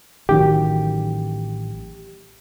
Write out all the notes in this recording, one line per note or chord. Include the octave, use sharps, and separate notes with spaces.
A1 D#3 F#3 G4